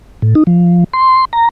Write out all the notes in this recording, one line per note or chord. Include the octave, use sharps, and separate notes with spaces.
A2
D#4
F3
C6
A#5